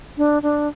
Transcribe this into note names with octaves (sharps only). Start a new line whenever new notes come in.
D4
D4